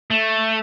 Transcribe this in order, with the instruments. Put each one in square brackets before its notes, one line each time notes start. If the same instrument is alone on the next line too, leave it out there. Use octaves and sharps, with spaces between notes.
[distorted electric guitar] A3